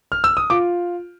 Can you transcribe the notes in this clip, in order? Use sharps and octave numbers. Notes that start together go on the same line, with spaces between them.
F6
E6
D#6
F4 D6